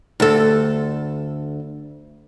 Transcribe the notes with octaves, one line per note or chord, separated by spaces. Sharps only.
D2 A4